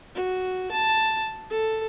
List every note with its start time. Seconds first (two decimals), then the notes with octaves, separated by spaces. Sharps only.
0.15 F#4
0.71 A5
1.50 A4